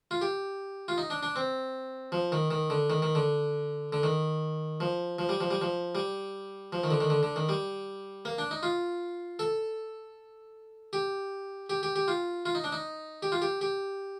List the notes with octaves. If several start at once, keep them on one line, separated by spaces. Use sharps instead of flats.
F4
G4
F4
D#4
D4
D4
C4
F3
D#3
D#3
D3
D#3
D#3
D3
D3
D#3
F3
F3
G3
F3
G3
F3
G3
F3
D#3
D3
D#3
D3
D3
D#3
G3
A#3
D4
D#4
F4
A4
G4
G4
G4
G4
F4
F4
D#4
D4
D#4
G4
F4
G4
G4